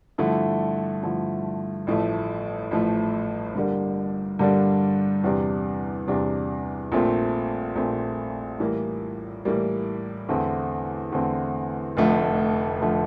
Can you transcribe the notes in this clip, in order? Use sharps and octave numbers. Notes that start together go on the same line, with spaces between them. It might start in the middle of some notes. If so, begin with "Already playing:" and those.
G2 D3 F3 A3 E4
G2 D3 F3 A3 E4
A1 A2 F3 A3
A1 A2 F3 A3
G2 D3 G3 A#3 D4
G2 D3 G3 A#3 D4
E2 C3 G3 D4
E2 C3 G3 D4
A#1 A#2 A3 C4
A#1 A#2 A3 C4
A2 E3 G3 A#3
A2 E3 G3 A#3
E2 D3 A3 C4
E2 D3 A3 C4
F1 F2 D3 F3 A3
D3 F3 A3